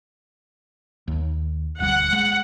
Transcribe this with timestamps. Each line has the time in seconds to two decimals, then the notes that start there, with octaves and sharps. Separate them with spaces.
1.08 D#2
1.80 E1 D2 G3 F#5
2.13 G#3